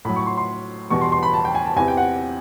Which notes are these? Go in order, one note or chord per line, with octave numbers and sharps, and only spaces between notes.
A2 F#3 B5
C#6
C6
C6
E2 B2 G3 C#6
C6
C6
B5
A5
G5
G#5
A5
E2 C3 E3 G#5
G5
F#5